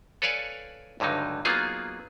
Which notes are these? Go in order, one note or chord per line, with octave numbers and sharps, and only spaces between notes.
A4 B4 C#5 D5 F5 G#5
C#2 G2 D3 F#3 D#4
F#3 A#3 B3 D#4 F4 G#4